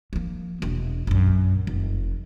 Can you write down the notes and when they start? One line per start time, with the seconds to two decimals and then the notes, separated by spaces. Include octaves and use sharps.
0.13 F3 A#3
0.62 E1
1.07 A#1 F#2
1.67 F1